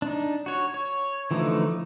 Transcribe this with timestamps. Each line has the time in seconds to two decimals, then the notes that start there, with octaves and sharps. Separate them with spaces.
0.02 D4 D#4
0.46 F#4 C#5
0.74 C#5
1.31 D3 E3 F3 A3 D#4